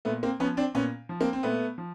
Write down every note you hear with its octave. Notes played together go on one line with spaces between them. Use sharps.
A#2 A3 B3
A#3 C4
F3 B3 C#4
C4 D4
A#2 B3 C#4
F3
A#3 C4
C4
A#2 A3 B3
F3